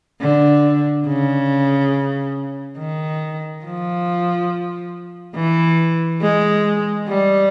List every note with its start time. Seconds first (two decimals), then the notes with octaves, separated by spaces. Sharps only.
0.21 D3
1.07 C#3
2.78 D#3
3.64 F3
5.35 E3
6.22 G#3
7.07 G3